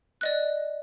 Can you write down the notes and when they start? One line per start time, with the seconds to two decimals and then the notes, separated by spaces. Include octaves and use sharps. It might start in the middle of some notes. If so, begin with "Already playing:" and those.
0.21 D5 D#5 F#6